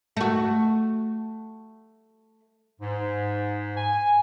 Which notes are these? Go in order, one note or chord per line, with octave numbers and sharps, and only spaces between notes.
A3 F#4
G#2
G#5